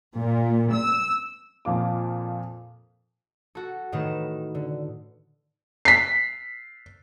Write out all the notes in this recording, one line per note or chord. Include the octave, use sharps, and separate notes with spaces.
A#2
E6
F2 A#2 F4 D6
F#4 A4
A2 D#3 D#4 B4 E7
D3
B6 C7